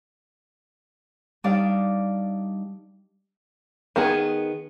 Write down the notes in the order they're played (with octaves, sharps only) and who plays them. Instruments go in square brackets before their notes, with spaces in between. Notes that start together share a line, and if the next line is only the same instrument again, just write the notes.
[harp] G3 D4 D#4 D5 F5
[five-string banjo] D#3 B3 G#4